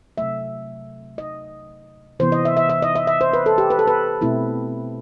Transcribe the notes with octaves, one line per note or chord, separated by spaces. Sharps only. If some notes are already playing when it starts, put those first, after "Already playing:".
C3 F#3 A3 E5
D#5
C3 E3 B3 C5
D#5
E5
E5
E5
D#5
E5
E5
C5
B4
A4
G4
B4
A4
B4
B2 A3 C4 E4